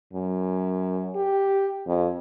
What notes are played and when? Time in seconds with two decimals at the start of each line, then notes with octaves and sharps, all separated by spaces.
0.13 F#2
1.15 G4
1.87 F2